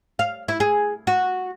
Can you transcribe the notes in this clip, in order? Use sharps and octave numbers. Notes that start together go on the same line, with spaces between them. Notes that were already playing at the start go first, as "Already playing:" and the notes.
F5
E4
G#4
F#4